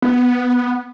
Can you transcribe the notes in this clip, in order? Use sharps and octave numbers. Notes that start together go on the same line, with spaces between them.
B3